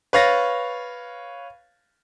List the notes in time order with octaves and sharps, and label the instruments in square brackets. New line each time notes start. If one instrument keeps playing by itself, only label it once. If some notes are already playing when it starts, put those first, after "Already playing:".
[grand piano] B4 C#5 F5 A6 A#6